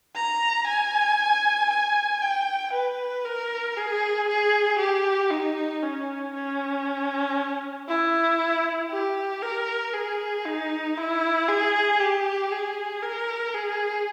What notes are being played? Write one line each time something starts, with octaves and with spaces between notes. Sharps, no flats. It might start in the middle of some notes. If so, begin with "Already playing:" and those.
A#5
G#5
G#5
G5
B4
A#4
G#4
G#4
G4
D#4
C#4
C#4
E4
G4
A#4
G#4
D#4
E4
G#4
G4
G#4
A#4
G#4